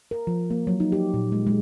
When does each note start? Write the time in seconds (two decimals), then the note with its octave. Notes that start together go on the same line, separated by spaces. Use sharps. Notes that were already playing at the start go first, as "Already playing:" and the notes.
0.11 A#4
0.27 F3
0.50 A#3
0.67 F#3
0.80 D#4
0.92 G4
1.14 A#2
1.32 G#3
1.47 G#3